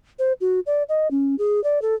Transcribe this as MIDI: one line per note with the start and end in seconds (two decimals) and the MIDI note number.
0.19 0.33 72
0.41 0.60 66
0.66 0.83 74
0.89 1.10 75
1.11 1.35 61
1.39 1.63 68
1.64 1.81 74
1.82 1.95 69